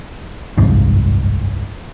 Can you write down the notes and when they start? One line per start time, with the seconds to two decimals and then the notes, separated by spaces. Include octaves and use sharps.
0.58 G1 C2 F2 G#2